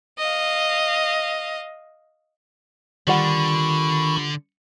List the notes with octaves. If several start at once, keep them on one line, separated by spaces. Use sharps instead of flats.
D#5 F5
D3 D#3 G3 F4 F#5 B5 C#6